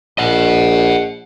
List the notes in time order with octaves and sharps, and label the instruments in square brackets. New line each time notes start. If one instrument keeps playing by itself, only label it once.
[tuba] A#1 [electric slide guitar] D#5 F#5